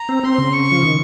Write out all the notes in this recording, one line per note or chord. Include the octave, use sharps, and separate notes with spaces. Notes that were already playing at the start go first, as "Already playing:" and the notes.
Already playing: A#5
C4
C4 C6
C#3
C#6
F3
D#3